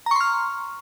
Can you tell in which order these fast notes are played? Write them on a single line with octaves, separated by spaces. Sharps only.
A#5 C#6 C6 F6